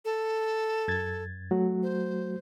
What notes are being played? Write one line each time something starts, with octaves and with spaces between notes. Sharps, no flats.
A4
F#2 G#6 A6
F#3 A3 F#4
C5